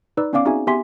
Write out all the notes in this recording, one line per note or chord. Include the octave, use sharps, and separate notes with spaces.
D#4 B4 D5 E6
B3 C#4 D5 F5 D6
C4 D#4 F#4 G#4 E5 G#5
B3 G4 E5 G#5 C6 B6